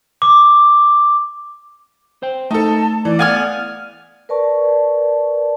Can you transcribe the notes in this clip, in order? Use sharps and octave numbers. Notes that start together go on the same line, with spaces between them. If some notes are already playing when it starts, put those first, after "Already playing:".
D6
C5 G5
A3 D#4 A4 A5
E3 D5
B3 F5 G#5 F6
A#4 B4 D5 A5 C#6